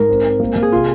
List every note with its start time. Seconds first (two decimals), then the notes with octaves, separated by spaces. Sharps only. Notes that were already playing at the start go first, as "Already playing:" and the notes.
Already playing: G#2 A#4
0.09 C4
0.25 C4
0.40 A#3
0.56 A#3
0.63 G#4
0.72 C3 F4